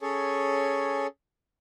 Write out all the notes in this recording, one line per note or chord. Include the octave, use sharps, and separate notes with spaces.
C#4 G#4 A4 C#5